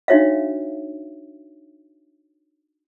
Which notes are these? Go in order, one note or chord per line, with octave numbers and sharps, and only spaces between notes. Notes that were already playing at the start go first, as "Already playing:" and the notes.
D4 D#4 F#4 C#5 E5 F5